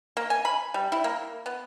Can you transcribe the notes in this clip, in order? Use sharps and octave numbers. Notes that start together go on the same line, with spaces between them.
A#3
G#5
B5
G3
E4
A#3
B3